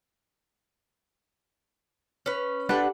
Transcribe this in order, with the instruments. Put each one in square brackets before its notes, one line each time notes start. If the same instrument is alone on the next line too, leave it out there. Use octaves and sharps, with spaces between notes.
[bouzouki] C#4 B4
[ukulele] D4 A4 B4 [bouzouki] G4 F#5